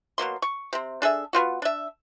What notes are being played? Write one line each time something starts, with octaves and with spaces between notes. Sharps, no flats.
B2 F#3 A#3 C6
C#6
C3 C4
D4 G#4 A4 E5
B3 C4 F4 F#4
D4 E5